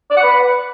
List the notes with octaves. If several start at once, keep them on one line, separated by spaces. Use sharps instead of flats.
D5
F#5
B4